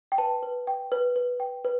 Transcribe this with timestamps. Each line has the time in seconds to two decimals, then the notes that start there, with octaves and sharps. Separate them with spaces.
0.12 G5
0.18 B4 A5
0.43 B4
0.67 G5
0.92 B4
1.16 B4
1.40 G5
1.65 B4